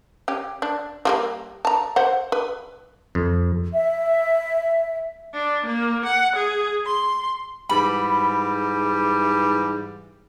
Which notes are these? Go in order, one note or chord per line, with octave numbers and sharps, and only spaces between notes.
C#4 G4
D4
F3 G3 A#3
A5 A#5
C5 F#5
B4
F2
E5
D4
A#3
F#5
G#4
C6
G#2 E3 G3 B5